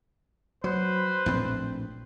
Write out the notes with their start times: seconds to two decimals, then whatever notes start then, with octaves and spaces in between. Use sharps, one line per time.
0.64 F#3 B4 C5
1.26 A#1 A2 C4